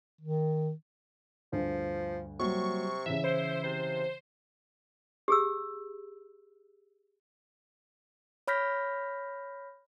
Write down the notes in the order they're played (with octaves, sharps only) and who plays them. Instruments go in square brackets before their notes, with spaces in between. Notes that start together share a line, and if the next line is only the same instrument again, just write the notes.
[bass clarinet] D#3
[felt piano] D2 G2 [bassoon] F3
[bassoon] C3 [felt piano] F#3 G3 A#3 [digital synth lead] C#6
[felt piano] C#3 E3 [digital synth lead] E5
[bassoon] E4 [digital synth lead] C5
[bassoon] C3 [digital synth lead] C5
[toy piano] G4 G#4 E6
[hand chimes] C#5 B5 F6 G6 A#6 B6